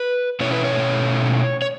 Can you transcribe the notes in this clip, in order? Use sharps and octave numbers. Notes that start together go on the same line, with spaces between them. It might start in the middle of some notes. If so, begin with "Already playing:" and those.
Already playing: B4
B2 A3 C#4 E4 C#5
B4
C#5
C#5